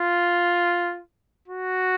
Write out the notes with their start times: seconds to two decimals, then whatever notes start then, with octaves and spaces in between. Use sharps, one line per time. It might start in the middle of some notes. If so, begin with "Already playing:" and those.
Already playing: F4
1.48 F#4